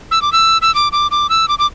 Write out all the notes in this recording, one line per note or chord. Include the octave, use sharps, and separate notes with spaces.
E6
D6
E6
E6
D6
D6
D6
E6
D6
D6